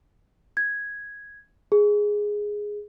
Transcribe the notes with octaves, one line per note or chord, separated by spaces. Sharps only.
G#6
G#4